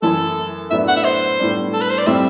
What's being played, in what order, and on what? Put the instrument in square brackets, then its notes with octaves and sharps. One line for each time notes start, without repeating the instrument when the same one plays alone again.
[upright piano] F#2 E3 A3 E4 [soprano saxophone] A4
[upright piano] A2 F#3 B3 D4 [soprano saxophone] E5
[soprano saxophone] F#5
E5
C5
[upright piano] A2 G3 B3 D4
[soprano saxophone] A4
B4
C5
D5
[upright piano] A2 G3 C4 [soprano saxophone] E5